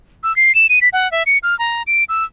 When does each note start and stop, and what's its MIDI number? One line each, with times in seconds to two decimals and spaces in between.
0.24 0.35 88
0.36 0.55 96
0.55 0.67 100
0.69 0.79 99
0.81 0.89 95
0.93 1.10 78
1.12 1.23 76
1.26 1.38 97
1.43 1.57 89
1.59 1.83 82
1.87 2.04 98
2.09 2.24 88